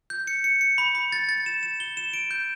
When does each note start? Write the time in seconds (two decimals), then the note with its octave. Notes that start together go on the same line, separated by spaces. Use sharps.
0.10 G6
0.27 C#7
0.44 C#7
0.61 C#7
0.78 B5
0.95 B5
1.12 A6
1.29 A6
1.46 E7
1.63 E7
1.80 G7
1.97 E7
2.14 D7
2.31 G6